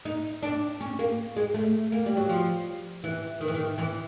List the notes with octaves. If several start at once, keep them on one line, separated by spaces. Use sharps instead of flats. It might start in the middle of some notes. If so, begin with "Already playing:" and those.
D#4
D4
C#4
A#3
G#3
A3
A#3
G3
F#3
F3
E3
D#3
E3
D#3
E3